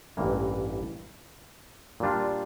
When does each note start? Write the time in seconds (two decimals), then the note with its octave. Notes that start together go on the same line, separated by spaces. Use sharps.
0.17 A1 G2 E3 A#3
2.00 A#2 G3 D4 F4